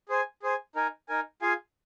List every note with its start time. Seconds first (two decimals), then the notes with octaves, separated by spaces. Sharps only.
0.09 G#4 C5 G#5
0.43 G#4 C5 G#5
0.76 D#4 A#4 G#5
1.09 D#4 A#4 G#5
1.42 F4 G#4 F5 G#5